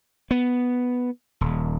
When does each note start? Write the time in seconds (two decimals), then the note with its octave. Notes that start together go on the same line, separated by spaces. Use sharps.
0.31 B3
1.41 D#1